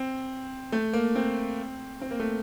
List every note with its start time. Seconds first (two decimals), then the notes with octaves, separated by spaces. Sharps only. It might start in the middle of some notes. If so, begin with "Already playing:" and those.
Already playing: C4
0.72 A3
0.93 A#3
1.15 C4
2.01 C4
2.11 A#3
2.20 A3